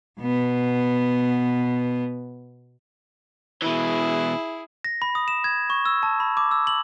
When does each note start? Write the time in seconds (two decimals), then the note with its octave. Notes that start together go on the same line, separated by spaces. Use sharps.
0.20 B2 B3
3.62 B2 E3 E4 G#4
4.84 A#6
5.02 B5
5.15 D#6
5.28 E7
5.44 G#6
5.70 C#6
5.86 E6
6.03 A5
6.20 B5
6.37 D6
6.51 E6
6.67 F#7